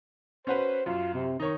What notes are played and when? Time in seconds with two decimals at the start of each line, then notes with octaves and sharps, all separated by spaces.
0.47 C#4 F#4 B4 C5
0.86 F#2 F4
1.14 C3
1.40 D#3 D#4 C#5